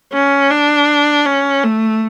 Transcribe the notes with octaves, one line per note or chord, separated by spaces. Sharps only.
C#4
D4
C#4
A3